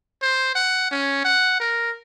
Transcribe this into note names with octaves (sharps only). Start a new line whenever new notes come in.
C5
F#5
C#4
F#5
A#4